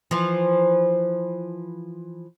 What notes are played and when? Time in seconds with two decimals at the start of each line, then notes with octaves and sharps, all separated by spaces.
0.11 E3 F3